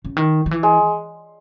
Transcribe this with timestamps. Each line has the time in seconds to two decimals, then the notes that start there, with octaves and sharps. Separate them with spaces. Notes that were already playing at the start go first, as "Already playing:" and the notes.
0.05 C#3
0.17 D#3
0.46 D#3
0.51 E3
0.63 G#3